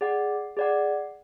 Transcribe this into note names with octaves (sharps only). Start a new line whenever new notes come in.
G#4 D5 F#5
G#4 D5 F#5